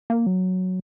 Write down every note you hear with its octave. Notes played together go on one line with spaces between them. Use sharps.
A#3
F#3